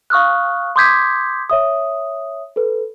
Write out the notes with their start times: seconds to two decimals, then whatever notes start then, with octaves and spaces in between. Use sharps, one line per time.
0.10 F5 C#6 D#6 F6 F#6
0.76 C6 D6 D#6 G6 G#6 B6
1.50 C#5 E5 D#6
2.56 A4 B4